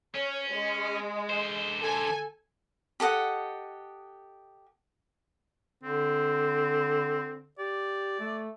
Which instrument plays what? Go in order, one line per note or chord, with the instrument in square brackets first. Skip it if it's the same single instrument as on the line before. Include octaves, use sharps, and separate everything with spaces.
[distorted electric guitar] C#4 [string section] C#5
[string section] G#3
[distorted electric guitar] D3 C5
[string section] A4 G#5
[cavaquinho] G4 A4 D#5 F#5
[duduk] D3 [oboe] C4
[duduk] G4 [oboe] D5
[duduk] A3